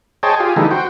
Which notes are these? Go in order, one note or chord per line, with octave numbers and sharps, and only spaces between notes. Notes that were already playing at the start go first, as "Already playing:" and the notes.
G#4 C5 C#5 D#5 G5 A5
F4 G4 G#4
D3 E3 G3 A3 D#4
F#4 C5 G5